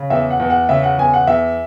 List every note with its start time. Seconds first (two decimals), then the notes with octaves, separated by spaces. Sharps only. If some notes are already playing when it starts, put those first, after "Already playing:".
Already playing: C#3
0.10 E2 E5
0.30 F#5
0.40 E2
0.50 F#5
0.69 C#3 E5
0.83 F#5
0.98 E2 G#5
1.14 F#5
1.27 E2 E5